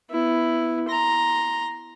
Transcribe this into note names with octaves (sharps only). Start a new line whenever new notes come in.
B3 E4
A#5 C6